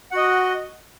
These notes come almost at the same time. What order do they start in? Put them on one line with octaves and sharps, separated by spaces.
F#5 F#4 D#5